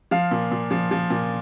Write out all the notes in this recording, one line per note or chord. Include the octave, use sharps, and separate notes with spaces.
F3 F5
A#2
A#2
F3
F3
A#2